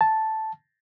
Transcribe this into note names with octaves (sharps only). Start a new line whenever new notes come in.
A5